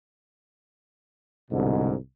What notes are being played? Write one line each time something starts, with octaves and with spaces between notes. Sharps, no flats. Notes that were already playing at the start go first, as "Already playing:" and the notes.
C2 G#2 B2 D3